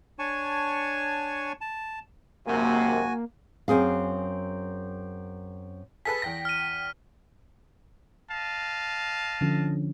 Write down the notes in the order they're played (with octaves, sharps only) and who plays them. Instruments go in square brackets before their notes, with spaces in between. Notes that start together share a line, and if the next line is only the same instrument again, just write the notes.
[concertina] D4 C#5 G#5 A5 C#6
A5
[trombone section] G#1 F#2 C3 [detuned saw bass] A#3 [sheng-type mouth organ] F#4 G#5
[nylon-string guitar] F#2 C4 G#4 F5
[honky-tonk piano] G#4 A4 B4 [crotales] B6
[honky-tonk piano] E2 G5 A#6
[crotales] F6 D#7
[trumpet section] D#5 F5 A5
[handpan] D3 F3 C#4